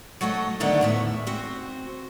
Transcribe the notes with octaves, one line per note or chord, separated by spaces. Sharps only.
F#3 A3 F#4 D#5
D3 D#3 A3 B3 D4
E2 A2 E5
C4 F#4